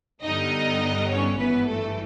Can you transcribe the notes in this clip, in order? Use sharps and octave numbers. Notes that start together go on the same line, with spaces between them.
G2 D3 G3 B3 D#4 D#5
C#4 C#5
G#1 G2 E3 B3 B4
A3 A4